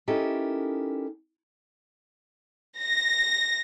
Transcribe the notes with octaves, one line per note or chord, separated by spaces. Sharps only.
C#4 D#4 E4 G4 A4 A#4
A#6